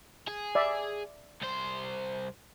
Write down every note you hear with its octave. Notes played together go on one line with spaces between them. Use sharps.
G#4
D5 E5
C2 C5